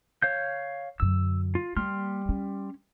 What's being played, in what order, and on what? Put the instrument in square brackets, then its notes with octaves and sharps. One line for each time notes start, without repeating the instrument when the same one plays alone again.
[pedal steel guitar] C#5 F5 G6
[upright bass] F#2 D3 [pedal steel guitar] E6
[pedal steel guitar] F4
[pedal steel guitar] G3 C6 F6 [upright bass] A#3
[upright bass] C#4